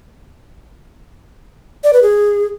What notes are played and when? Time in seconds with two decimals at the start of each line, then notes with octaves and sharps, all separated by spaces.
1.84 D5
1.93 B4
2.03 G#4